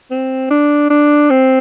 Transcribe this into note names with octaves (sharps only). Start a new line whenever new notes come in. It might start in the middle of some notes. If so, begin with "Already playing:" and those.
C4
D4
D4
C4